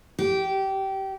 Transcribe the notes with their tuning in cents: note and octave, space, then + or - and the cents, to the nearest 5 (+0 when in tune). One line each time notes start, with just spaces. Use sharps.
G4 -20